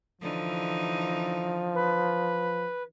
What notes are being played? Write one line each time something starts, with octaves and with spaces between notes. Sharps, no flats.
D3 E3 F3 D#4
B4